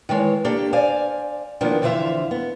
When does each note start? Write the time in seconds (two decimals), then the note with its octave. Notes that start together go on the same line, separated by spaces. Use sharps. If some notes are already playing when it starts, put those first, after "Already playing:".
0.09 D#3 E3 G#3 C#5
0.45 A#3 D4 G4 A4
0.73 C5 D5 F5 G#5
1.61 D#3 F3 A#3 B3 D4
1.82 F2 D3 E3 C5 E5 F5
2.31 B3